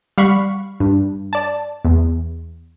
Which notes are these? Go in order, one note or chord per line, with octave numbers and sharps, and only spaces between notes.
G3 F5 F#5 B5 C#6
G2
D5 A5
E2